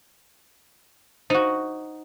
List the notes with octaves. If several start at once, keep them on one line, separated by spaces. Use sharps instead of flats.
D#4 F#4 C5